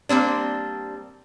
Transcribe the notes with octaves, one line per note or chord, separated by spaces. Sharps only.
G3 A#3 C4 D4